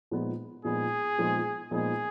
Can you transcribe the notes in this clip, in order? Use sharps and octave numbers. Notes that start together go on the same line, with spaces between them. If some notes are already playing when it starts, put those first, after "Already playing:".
A#2 F3 G#3 B3 D#4
A#2 F3 G#3 B3 D#4 G#4
A#2 F3 G#3 B3 D#4
A#2 F3 G#3 B3 D#4 G#4